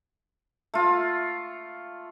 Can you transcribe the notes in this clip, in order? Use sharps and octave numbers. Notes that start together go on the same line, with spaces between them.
A3 F4